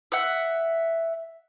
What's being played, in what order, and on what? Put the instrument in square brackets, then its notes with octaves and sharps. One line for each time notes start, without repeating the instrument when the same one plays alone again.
[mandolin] E5 F#5